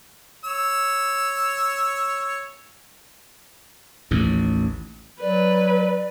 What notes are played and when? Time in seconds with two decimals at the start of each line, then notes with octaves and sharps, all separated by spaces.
0.45 C#5 E6
4.11 A1 D#2
5.21 F#3 B4 D5